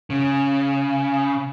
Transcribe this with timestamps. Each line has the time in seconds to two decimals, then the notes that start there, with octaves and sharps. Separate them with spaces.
0.10 C#3